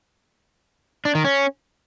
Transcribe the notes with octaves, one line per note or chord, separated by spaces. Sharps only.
D4
D#3
C#4